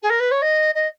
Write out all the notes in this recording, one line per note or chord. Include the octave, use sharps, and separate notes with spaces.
G#4
A#4
B4
C#5
D#5
D#5